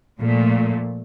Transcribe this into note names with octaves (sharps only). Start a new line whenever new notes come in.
A#2 F3 A3